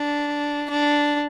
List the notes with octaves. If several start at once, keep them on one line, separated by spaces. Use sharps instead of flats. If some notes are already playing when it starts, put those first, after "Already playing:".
Already playing: D4
D4